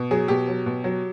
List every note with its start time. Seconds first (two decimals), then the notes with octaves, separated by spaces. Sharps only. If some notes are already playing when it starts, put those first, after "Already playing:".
Already playing: B2
0.11 F#3 G#4
0.28 B2 G4
0.48 F#3
0.66 B2
0.84 F#3